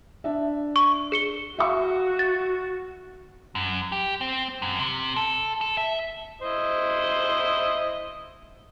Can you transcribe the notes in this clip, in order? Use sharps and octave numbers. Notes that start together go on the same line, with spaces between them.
D4 E5
C#6
G#4 C#7 G7
F#4 E5 F5 C#6
A6
F#2
G4
C4
F#2
C3
A4
A4
E5
E4 C5 D#5